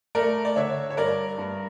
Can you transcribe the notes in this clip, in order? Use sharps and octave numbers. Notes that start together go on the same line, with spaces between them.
A3 A#4 D5
D5
D3 C#5 E5
C#5
G2 A#4 D5
G2